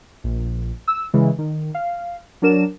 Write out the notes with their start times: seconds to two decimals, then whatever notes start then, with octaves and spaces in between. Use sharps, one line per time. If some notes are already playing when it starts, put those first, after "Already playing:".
0.24 A#1
0.88 E6
1.14 C#3 E3 G#3
1.38 D#3
1.74 F5
2.42 F#3 D4 A#4 E7